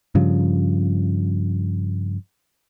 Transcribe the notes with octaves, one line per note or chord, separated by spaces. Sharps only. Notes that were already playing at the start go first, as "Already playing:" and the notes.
G2 C#3 F3